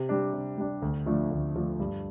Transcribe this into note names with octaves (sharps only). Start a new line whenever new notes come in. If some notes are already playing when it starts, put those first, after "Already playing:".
Already playing: C3
G3 D4
C3
G3 D4
D2
D3 F3 A3 D4
D2
D3 F3 A3 D4
G2